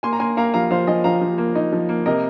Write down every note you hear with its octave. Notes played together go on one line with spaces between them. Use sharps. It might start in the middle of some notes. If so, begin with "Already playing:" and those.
A#3 G#5 C6
A#5
A#3 G#5 C6
A#3 F5 A#5
F3 F5 A#5
F3 C5 F5
F3 D#5 G#5
F3 F5 A#5
F3
A#3
D#4
F3
A#3
C3 A#4 D#5